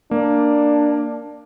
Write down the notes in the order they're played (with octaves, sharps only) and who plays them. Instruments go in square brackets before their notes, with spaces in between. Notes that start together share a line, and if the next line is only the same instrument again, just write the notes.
[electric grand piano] A#3 [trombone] D4